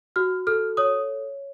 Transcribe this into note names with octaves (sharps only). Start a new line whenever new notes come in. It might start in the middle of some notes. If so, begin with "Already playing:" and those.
F#4 F6
A4 F6
C#5 D#6